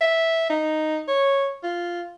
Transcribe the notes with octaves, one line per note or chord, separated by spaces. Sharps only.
E5
D#4
C#5
F4